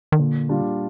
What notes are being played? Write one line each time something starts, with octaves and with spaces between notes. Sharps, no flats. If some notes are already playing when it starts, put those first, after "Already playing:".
D#3
A#2 D3
G3 D4 F4